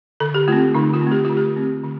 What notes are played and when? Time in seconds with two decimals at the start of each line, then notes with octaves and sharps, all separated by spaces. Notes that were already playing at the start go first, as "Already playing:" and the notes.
0.20 D3 A4
0.34 G4
0.48 A3 C4 F4
0.74 D3 D#4
0.94 F4
1.02 C4
1.07 A3 G4
1.25 D3 F4
1.37 G4
1.56 A3 C4
1.84 D3